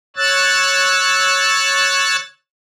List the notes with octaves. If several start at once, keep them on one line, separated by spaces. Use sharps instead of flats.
C#5 E6 F#6 A6